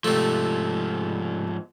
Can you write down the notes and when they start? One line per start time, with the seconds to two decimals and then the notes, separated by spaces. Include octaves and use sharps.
0.04 G#2 C3 F3 A3